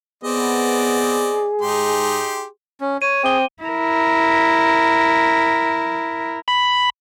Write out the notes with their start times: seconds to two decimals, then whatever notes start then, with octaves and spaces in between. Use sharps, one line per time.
0.24 B3 C4 G#4 D5 D#5
1.61 G#2 G#3 D#4 G4 C6
2.80 C#4
3.02 C#5 D#7
3.24 C4 G#4 D6 G7
3.63 E4 A#4
6.48 B5